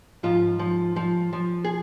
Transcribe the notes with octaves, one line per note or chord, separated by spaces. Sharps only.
G#2 F3 F4
F3
F3
F3
G#4